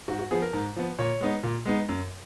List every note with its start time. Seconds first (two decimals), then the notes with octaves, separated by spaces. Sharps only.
0.08 G#2 F#4
0.19 F#4
0.31 F3 B3 G#4
0.42 A#4
0.53 G#2
0.76 F3 B3
0.99 A#2 C#5
1.21 G#3 B3 D#4
1.43 A#2
1.66 G#3 B3 D#4
1.88 F#2